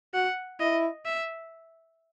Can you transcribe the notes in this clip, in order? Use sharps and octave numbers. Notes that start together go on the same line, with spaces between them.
F#4 F#5
E4 D#5
E5